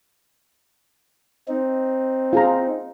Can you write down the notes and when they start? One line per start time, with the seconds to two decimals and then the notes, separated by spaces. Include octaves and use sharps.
1.48 C4 D#4
2.33 F4 G#4 A#5